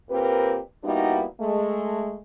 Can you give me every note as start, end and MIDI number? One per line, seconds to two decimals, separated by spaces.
0.11 0.60 46
0.11 0.60 60
0.11 0.60 67
0.11 0.60 70
0.11 0.60 71
0.83 1.24 55
0.83 1.24 58
0.83 1.24 59
0.83 1.24 63
0.83 1.24 64
0.83 1.24 66
1.40 2.18 56
1.40 2.18 57